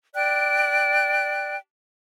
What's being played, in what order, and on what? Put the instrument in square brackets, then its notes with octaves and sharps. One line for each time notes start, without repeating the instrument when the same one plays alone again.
[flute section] D5 G5 F#6